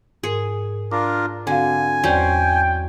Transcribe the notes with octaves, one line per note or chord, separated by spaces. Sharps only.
G#2 G#4 A#4
D4 F4 A#4 D6
D3 C4 F#4 F5 G#5
E2 F#3 C#4 C5 D5 G5 G6